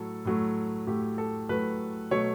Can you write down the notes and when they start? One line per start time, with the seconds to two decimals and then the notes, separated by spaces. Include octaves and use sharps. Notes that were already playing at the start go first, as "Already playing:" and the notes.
Already playing: A2 F#3 A3 A4
0.25 A2 F#3 A3
0.87 A2 F#3 A3 G4
1.18 A4
1.49 A2 F#3 A3 B4
2.11 B2 F#3 A3 C#5